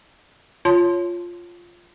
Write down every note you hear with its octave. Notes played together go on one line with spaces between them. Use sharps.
F4 C#5 A5 C6